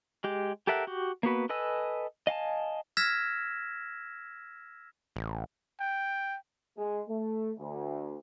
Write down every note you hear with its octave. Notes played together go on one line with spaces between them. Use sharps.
G#3 G4
G4 A4 A#4 E5 F#5
F#4 G4
A#3 B3 F#4 B4
A4 B4 D#5 G#5 E6
D#5 F5 G#5 A5
E6 F6 G#6 A#6 B6 E7
A1
G5
G#3
A3
D2